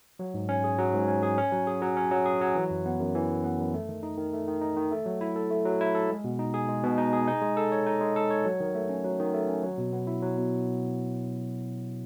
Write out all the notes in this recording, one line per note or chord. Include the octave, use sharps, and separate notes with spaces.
F#3
G#2
C#4
G#4
F#3
G#2
C#4
G#4
C#4
F#3
G#4
F#3
C#4
F#3
G#4
F#3
E3
F#2
B3
F#2
E3
F#2
B3
F#2
A3
D#3
D#4
D#3
A3
D#3
D#4
D#3
A3
F#3
E4
A4
A3
F#3
E4
A4
G#3
B2
D#4
G#4
G#3
B2
D#4
G#4
D#4
G#3
A4
C#5
D#4
G#3
A4
C#5
F#3
D#3
A3
C#4
F#3
D#3
A3
C#4
F#3
B2
B3
E4
F#3
B2